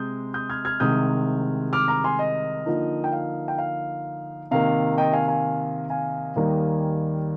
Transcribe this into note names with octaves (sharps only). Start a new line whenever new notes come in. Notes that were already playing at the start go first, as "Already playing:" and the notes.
Already playing: C3 G#3 D#6 G6
D#6 G6
F6 G#6
F6 G#6
C2 C3 D#3 G#3 D#6 G6
D6 F6
A#5 D6
G#5 C6
D#5
D3 F3 A#3 D#4
G5
F5
G5
F5
C3 D#3 A#3 F5
D#5 G5
F5 G#5
F5 G#5
F5 G#5
D#2 D#3 G3 A#3